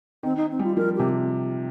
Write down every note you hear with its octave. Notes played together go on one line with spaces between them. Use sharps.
D#3 C4
D#4
C4
G3
F4
F3 A#4
C3 G4